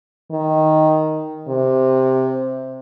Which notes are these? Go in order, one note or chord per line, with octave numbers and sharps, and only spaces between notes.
D#3
C3